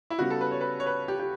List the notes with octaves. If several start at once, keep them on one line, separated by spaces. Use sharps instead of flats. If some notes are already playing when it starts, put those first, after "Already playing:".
E4
C#3 G3 B3 F#4
A4
B4
C#5
B4
C#5
B4
G4
G4